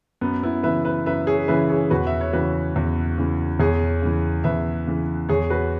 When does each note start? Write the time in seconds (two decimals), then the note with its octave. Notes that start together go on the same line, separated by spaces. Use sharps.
0.21 F#2 B3
0.43 B3 E4
0.63 C#3 E3 B4 E5
0.85 B4 E5
1.06 F#2 B4 E5
1.27 G#4 C#5
1.48 C#3 E3 B4 E5
1.69 G#4 C#5
1.90 E2 F#4 B4
2.07 E5
2.21 C#5
2.33 C#3 E3 F#4 B4
2.76 E2
3.18 C#3 E3
3.60 E2 G#4 C#5
4.02 C#3 E3
4.44 E2 B4 E5
4.87 C#3 E3
5.29 E2 G#4 C#5
5.50 F#4 B4